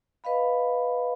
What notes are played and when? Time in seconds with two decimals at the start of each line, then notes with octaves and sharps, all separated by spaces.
0.24 B4 D#5 F5 B5